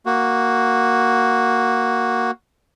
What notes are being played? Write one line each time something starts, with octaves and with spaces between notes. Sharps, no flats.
A#3 F#4